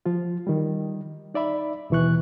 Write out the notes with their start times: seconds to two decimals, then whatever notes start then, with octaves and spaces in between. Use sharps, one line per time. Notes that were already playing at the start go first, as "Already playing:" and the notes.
0.06 F3 F4
0.47 D#3 G3
1.34 D#4 D5 E5 B5
1.90 D#2 B2 E3 C#6 F#6